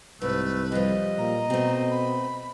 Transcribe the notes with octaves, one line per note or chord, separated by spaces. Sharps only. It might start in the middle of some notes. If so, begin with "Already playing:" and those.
C2 G#2 A3 B4
F3 G3 D#5
A#2 A#5
B2 A3 C4
B5